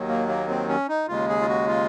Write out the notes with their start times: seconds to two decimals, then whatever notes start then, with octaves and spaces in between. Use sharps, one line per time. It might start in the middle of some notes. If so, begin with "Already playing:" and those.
Already playing: D#2 D#3 F#3
0.09 A#3
0.29 A#3
0.48 C4
0.69 C#4
0.89 D#4
1.08 D#2 C#3 G#3 F4
1.28 G#4
1.41 F4
1.48 F#4
1.68 F4